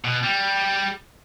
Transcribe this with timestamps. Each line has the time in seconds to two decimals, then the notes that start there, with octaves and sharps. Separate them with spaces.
0.04 B2
0.23 G3